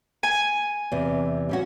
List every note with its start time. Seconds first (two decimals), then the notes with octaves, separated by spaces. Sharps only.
0.23 G#5
0.92 E2 C3
1.49 G3 C#4 F#4